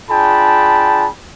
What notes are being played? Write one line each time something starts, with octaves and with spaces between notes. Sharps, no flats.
D4 F4 G#4 G5 A5 B5